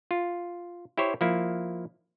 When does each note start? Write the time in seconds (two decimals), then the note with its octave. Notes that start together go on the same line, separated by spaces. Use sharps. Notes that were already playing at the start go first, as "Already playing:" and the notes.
0.11 F4
0.97 E4 G4 C5 C#5
1.21 F3 A#3 E4